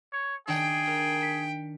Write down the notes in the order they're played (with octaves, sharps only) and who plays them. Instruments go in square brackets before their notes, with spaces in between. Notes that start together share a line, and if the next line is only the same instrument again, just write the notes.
[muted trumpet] C#5
[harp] D#3 D4 [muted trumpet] G#4 [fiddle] G5
[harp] A#4
B6 C#7 D#7